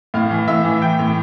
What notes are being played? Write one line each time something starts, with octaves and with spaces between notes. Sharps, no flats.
A2 F5
E3
A2 E5
E3
E3 G5
A2